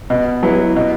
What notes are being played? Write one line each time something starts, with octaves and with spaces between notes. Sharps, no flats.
B2
F#3 B3 E4
B2